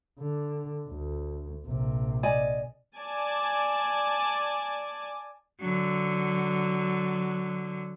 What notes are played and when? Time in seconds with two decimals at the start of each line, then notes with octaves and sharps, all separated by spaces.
0.19 D3
0.89 D2
1.66 A#1 C3
2.23 D5 D#5 G#5
2.96 D5 G#5 A5
5.60 D3 F#3